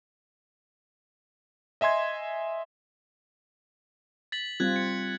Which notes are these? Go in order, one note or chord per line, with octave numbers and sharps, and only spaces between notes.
D#5 E5 G#5 C6 G#6
A6 B6 F#7
G3 C4 F4 F#6 G#6
C#7